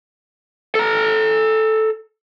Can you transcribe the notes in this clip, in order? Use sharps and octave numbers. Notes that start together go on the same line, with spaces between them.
A4 A#5